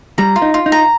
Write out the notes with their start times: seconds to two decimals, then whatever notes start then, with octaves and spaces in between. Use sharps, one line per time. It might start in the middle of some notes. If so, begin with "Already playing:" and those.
0.18 G3 A#5
0.36 F4
0.42 D#4
0.54 F4
0.66 D#4
0.72 A#5